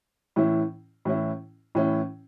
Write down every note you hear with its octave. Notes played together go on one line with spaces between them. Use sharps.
A2 E3 C#4 E4
A2 E3 C#4 E4
A2 E3 C#4 E4